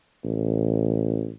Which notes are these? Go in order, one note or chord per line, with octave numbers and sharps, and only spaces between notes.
A1